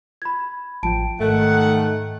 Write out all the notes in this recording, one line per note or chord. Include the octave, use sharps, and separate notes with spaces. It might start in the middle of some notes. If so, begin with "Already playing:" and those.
B5 G#6
A1 F3 G5 A5 D7
G#2 D#3 A3 F#5